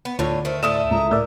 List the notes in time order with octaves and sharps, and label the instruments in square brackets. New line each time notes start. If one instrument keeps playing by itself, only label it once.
[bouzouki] B3
[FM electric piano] D2 [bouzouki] A2 D3 C#5 [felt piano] F4
[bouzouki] D#3 A3 [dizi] C5
[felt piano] A2 D#6 E7 [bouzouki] A3 E4 A4 [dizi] D5
[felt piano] C#2 [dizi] A#5
[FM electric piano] A2 D5 [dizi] A#4 [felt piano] E6